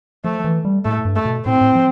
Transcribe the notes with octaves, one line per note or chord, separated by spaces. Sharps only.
F3 A3
E3
G3
A2 A3
G2
A3
B2
A2 C4
A2
F3